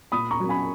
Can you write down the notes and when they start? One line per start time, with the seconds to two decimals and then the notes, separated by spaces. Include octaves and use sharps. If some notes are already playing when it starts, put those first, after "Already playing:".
0.12 A#2 B5 D#6
0.31 A#5 C#6
0.40 F#3 A#3 C#4
0.49 G#5 B5